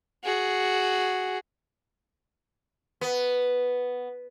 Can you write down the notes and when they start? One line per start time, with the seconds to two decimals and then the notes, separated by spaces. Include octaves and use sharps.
0.24 F#4 G#4
3.01 B3